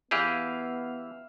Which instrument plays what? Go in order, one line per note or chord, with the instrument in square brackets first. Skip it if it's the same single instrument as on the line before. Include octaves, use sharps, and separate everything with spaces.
[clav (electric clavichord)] E3 G4 G#4 [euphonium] B3 [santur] E5 F5